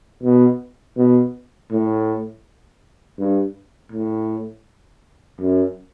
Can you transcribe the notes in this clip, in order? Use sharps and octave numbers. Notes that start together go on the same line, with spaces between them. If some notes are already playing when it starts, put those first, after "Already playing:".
B2
B2
A2
G2
A2
F#2